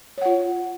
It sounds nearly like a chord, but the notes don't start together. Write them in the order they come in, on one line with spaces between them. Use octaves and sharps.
C#5 F#5 F4